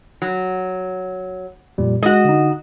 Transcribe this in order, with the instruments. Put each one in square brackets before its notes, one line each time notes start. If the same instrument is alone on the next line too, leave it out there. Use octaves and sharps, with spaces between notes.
[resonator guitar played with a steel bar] F#3
[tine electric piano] F2 A#2 G3
[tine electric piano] G#3 [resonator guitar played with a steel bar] F#4 D#5
[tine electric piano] D3 D#4